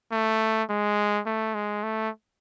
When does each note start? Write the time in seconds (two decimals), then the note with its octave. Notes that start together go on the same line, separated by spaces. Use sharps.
0.12 A3
0.70 G#3
1.26 A3
1.55 G#3
1.84 A3